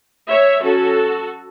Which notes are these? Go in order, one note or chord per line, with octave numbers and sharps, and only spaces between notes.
C#5 E5
F#3 C#4 F#4 A4